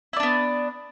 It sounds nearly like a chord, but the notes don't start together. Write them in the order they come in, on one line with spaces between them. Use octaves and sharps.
E4 D5 D4 B3